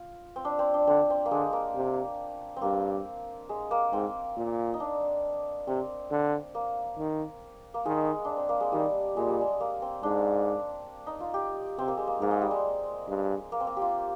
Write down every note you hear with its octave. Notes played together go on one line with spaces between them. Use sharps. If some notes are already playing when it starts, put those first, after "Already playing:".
Already playing: F4
C4
D4
C4
D4
D3 C4
C4
A#3
D3 G#3
A#3
C3
C4
G2 A#3
G#3
A#3
G#2 C4
A#2
D#4
D4
C3 C4
D3
A#3
D#3
A#3
D#3 G#3
D4
C4
A#3
G#3
D#3 G3
A#2 G#3
G3
G#3
A#3
C4
G#2 D4
D#4
F4
G4
C3 C4
A#3
G#3
A#3
G#2 A#3
G#3
G3
G#3
G2
A#3
C4
A#3
F4 G4